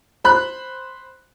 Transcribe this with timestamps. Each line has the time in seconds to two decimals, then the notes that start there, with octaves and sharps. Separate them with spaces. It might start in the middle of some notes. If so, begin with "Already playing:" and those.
0.24 C5 B5 F#6